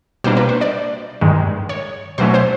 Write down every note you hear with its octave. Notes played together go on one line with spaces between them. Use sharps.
B2 G3 A#3 D4 C5
B4
C5
D5
G2 D#3 G#3
C#5
B2 F#3 A3 C#4 C5
C5